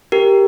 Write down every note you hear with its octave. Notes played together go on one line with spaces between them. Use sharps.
G4 A#4